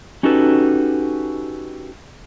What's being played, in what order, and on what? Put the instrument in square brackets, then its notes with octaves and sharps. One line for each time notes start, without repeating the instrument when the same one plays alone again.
[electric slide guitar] C#4 D#4 F#4 G4 A4 B4